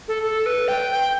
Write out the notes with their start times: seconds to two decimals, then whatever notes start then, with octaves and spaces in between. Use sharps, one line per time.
0.08 A4
0.23 A4
0.46 B4
0.68 G5
0.91 G5